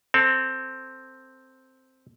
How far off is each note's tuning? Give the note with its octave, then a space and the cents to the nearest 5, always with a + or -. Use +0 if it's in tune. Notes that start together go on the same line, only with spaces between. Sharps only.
C4 +0 A4 +15